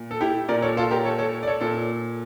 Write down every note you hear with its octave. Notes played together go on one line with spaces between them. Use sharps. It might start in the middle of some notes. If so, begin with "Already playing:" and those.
Already playing: A#2
A4
E4 G4
A#2 A#4 D5
A4 C#5
F4 A4
G4 A#4
A4 C#5
A4 C#5
D5
A4 C#5
A#2 A4